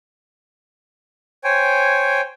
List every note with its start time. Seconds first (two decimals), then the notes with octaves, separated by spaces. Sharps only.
1.44 C5 C#5 G5 G#5